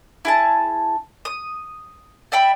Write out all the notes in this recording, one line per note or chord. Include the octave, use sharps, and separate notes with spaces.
E4 G#4 A5
D#6
D5 E5 G5 B5